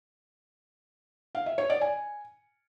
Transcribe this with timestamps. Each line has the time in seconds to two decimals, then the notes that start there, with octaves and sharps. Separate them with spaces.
1.35 F5
1.46 E5
1.58 C#5
1.70 D5
1.81 G#5